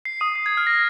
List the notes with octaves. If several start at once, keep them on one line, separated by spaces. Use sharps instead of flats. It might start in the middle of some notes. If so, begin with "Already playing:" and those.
C7
D#6 D#7
C7
G#6
F6
A#6